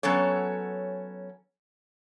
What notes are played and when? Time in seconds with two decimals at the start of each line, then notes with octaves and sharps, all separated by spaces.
0.03 F#3 B3 C#4 A4 C#5